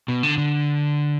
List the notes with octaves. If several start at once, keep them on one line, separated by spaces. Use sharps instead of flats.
B2
D3
D3